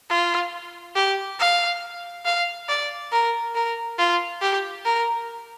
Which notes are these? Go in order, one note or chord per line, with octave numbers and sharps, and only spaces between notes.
F4
G4
F5
F5
D5
A#4
A#4
F4
G4
A#4